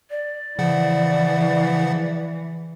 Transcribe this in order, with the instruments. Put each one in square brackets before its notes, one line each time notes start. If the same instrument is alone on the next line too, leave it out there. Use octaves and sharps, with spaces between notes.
[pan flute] D5
[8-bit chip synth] C#3 F3 F#5 [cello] E3